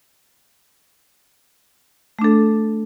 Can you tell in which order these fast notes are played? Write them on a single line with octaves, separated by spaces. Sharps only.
A3 D4 A4